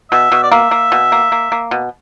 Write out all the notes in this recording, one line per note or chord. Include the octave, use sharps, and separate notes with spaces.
B2 E5
B2
D5
A#3 E5
A#3
B2
A#3
A#3
A#3
B2